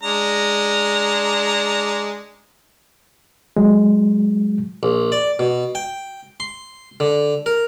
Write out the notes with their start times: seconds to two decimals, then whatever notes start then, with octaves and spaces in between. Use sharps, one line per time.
0.03 G#3 D4 A#5
3.57 F#3 G#3
4.83 A#1
5.12 D5
5.39 B2
5.75 G5
6.40 C6
7.00 D3
7.46 A#4